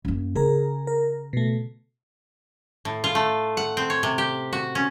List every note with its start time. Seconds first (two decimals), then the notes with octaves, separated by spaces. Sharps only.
0.05 F#2 A#3
0.35 C#3 G#4 A#4 A#5
0.87 A#4
1.33 B2 A3
2.85 A2
3.04 F4
3.15 A3
3.57 F#5
3.77 C4
3.90 C#5
4.03 C3
4.18 G4
4.53 F#4
4.75 C#4